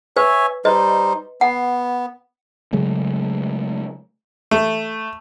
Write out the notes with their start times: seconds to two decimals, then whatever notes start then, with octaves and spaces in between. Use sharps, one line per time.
0.17 B4 C#5 E5 G#5
0.65 G3 D#4 B4 C5 D#5
1.41 B3 F#5
2.73 C#3 F#3 G#3 A3
4.51 A3